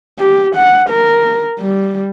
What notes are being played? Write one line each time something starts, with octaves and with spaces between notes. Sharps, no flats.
G4
F#5
A#4
G3